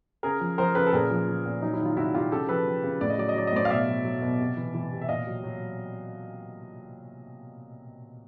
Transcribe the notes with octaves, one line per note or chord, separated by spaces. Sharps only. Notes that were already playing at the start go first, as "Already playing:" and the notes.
C#3 G#4 A#4
F3
F3 A#4 C5
C#3 A4 B4
A4
A#2 G#4 A#4
F3
F3
A#2
F#3 D#4
E4
D#3
F4
C3 E4 F#4
C3 F4 G4
C#3 G4 A4
F3 A4 B4
F3
C#3
A2 D5
D#5
F#3 D5
D#5
F#3 D5
D#5
A2 C5 D5
F5
B2 D5 E5
F#3
F#3
B2
C3
E3
E3
C3
E5
A#2 D#5 F5
F#3
F#3